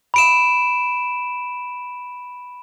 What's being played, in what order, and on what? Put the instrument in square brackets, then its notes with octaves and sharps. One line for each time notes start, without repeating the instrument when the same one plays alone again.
[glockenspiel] B5 D7 E7